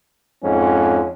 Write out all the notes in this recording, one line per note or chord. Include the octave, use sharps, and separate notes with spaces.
F2 G#2 C#4